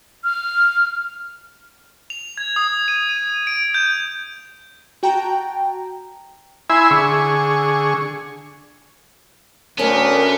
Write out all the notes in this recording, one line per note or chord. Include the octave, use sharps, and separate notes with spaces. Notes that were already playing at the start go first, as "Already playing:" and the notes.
F6
F7
G#6
D#6
D#7
D#7
D7
G6
F#4 G5 A5 A#5
E4 E5 G#5 B5 C6
D3 G#4 C#6
D2 A3 B3 C#4 D4 A#4